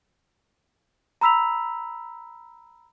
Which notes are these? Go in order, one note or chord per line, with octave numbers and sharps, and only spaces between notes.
A#5 B5 E6 B6 F7